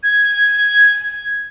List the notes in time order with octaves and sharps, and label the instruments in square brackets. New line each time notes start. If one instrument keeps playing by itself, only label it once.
[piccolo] G#6